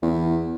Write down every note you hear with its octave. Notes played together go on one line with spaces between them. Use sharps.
E2